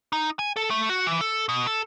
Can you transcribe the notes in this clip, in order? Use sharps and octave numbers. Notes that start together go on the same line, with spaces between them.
D#4
G#5
A4
A3
F#4
E3
A4
B2
A4